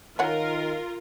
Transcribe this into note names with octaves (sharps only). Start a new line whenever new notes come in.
D#3 F4 A#4 C#5 F#5 G#5